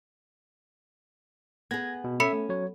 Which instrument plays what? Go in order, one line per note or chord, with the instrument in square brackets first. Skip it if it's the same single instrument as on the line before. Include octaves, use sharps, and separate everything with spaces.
[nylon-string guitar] B3 G#4 [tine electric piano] G#6 A#6
[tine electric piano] B2
[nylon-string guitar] C#4 [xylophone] A4 B5 C#7 [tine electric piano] E5
[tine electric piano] A3
F#3 C#5